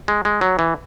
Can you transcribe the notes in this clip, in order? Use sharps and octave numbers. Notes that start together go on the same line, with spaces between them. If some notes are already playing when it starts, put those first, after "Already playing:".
G#3
G#3
F#3
E3